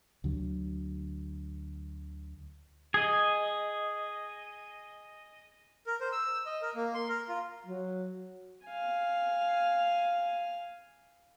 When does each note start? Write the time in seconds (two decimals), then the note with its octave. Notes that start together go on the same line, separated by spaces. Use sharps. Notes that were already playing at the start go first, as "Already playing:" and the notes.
0.24 D2 D3 F#3
2.94 G#4 D#5
5.87 A#4
6.01 C5
6.12 E6
6.46 D#5
6.62 A#4
6.75 A#3
6.94 C6
7.09 A#4
7.28 F4
7.67 F#3
8.66 F5 G#5